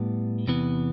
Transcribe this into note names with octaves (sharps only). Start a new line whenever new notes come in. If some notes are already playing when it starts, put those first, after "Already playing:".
Already playing: A2 G3 B3
E2 C3 E3 B3